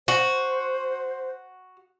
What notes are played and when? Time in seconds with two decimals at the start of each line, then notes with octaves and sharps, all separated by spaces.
0.08 F#4 C5